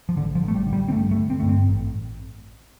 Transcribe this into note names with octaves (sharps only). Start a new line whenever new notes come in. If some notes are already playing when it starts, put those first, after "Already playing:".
F3
A1 D3
F3
A1
A3
G3
D3
G3
C4
G2 A3
A3
D3
C4
G2 A3
C4
A1